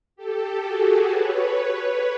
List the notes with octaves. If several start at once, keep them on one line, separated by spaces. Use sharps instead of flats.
G4 A4
F#4 G#4
B4 C#5